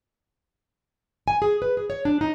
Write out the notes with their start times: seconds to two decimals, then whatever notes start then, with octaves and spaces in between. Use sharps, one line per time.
1.28 G#5
1.42 G#4
1.62 B4
1.77 G#4
1.90 C#5
2.05 D4
2.21 D#4